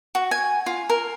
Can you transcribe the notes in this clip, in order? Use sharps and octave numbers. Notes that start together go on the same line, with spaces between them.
F#4
G#5
F4
A#4